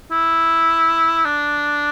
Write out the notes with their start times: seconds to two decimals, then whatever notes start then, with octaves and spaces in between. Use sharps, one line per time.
0.11 E4
1.25 D4